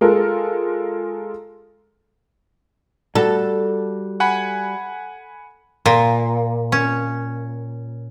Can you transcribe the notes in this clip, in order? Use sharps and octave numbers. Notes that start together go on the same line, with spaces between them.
G#3 F4 A4 A#4
G3 F#4 A4
F#5 G#5 B5
A#2
C#4